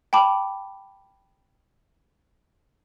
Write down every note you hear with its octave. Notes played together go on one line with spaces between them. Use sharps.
G5 A5 B5 D6